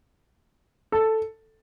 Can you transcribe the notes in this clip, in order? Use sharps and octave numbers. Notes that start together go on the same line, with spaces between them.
A4